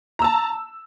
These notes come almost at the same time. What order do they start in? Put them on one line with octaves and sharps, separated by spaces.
A#5 E6 A5